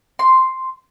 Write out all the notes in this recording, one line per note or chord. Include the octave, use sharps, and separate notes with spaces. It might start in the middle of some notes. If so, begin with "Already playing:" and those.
C6